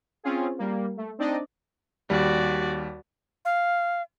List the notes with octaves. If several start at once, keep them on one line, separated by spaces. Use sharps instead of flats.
C4 C#4 F4 G#4
G3 A#3
A3
C4 D4 D#4 D5 D#5
D#2 G3 F#4 D5
F5